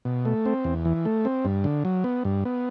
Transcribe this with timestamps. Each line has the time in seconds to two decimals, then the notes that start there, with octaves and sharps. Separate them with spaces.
0.05 B2
0.25 A3
0.46 C4
0.64 E2
0.85 E3
1.05 A3
1.25 C4
1.45 G2
1.64 D3
1.85 F#3
2.04 B3
2.25 G2
2.45 B3